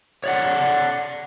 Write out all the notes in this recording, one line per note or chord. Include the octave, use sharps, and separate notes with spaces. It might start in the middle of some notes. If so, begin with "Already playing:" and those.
C#5 D5 F#5